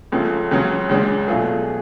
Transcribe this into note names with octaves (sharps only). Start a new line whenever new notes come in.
C#2 C#3 F3 A3
C#2 C#3 F#3
C#2 C#3 G#3 D4
B2 F#3 A3 F4 G#4